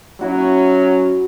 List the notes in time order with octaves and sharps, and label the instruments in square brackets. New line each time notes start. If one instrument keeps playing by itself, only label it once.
[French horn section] F#3 C#4 [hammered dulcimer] E4 F#4